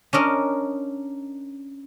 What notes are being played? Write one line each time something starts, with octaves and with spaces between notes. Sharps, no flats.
C#4 D4 A#4 D#5